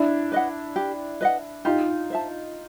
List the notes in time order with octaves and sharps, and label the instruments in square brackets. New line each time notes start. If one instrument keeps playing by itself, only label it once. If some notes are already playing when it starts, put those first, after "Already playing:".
Already playing: [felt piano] D4 E4
[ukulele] B4 D#5 F#5
G4
B4 D#5 F#5
[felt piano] D#4 F4 [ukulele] G4
[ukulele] C5 E5 A5